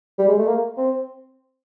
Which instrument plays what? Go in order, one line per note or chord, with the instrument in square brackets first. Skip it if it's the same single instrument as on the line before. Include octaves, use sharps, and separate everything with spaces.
[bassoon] G3
G#3
A3
A#3
C4